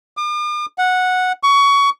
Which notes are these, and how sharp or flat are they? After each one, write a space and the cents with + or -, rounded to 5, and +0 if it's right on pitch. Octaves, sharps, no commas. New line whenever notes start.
D6 +45
F#5 -10
C#6 +20